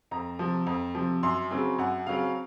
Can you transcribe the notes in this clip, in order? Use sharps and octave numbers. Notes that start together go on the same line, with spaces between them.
F2 A#5
C3 F3
F2
C3 F3
F#2 C6
C#3 F#3 C4
F#2 F#5
C#3 F#3 C4 F5